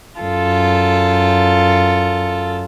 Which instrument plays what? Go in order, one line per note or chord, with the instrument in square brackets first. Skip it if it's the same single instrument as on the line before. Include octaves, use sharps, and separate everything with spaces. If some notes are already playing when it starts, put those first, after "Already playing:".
[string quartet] F#2 F4 A4